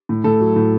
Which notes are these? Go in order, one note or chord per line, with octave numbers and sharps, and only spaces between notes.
A2
A2 A4
F#3
A2